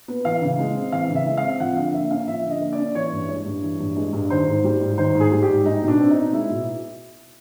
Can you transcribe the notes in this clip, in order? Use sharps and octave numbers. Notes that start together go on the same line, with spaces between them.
B3
E3 F5
C#3
G#3
C4
E3 F5
C#3
E5
G#3
F5
C4
F3 F#5
D3 F5
A#3 E5
C#4 F5
F3 E5
D3
D#5
A#3
D5
C#4
E3 C#5
G2
G#3 C#5
G2
E3
G2
G#3
G2
D#3 C5
G#2
G3
G#2
D#3 C5
G#2
G#4
G3
G4
G#2
G#3 D#4
B2
D4
C4
D#4
B2
G#3 E4
B2